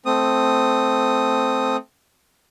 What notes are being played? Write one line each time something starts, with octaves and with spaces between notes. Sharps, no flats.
A3 C4 D#6